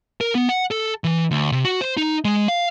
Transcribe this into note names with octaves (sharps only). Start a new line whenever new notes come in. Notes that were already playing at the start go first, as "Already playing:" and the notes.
A#4
B3
F#5
A4
E3
D2
C3
F#4
C5
D#4
G#3
F5